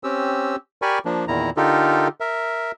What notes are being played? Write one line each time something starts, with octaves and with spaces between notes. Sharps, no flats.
C4 C#4 G4 E6
G4 A#4 D5 G#5 B5 C#6
F3 A#3 D4
E2 A#2 D#3 E4 A#5
D3 D#4 F4 G4 A4 A#4
A#4 E5